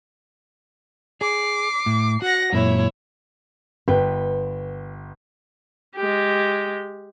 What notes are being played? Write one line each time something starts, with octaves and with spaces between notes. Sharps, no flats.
G#4 D6 C7
A2
F#4 F#5 A#6
F#2 A#2 E4 C#5
G1 B4 G5
G#3 G4